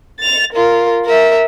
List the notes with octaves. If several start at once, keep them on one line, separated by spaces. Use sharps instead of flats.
A6 F7
F4 A#4
A#4 E5